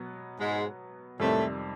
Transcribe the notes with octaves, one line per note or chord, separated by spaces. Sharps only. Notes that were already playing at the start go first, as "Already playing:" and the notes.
Already playing: B2 F#3 B3
G#2 G#3
F2 A2 C3 D#3 G3 A3 C4